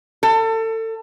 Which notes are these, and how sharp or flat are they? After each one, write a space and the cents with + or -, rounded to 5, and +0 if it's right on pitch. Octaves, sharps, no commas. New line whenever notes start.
A4 +30